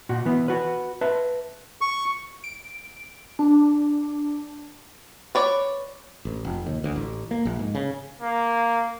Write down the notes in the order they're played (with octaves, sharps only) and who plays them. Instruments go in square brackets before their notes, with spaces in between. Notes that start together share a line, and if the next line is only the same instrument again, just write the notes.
[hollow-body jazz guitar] A#2 F#4
E3 B3
F#4 B4
B4 E5 A5
[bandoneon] C#6
[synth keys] D7
D4
[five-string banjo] B4 C#5 D5
[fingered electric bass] A1
F1
D#2
D2
A1
A#3
A#1
G#2
C#3
[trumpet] A#3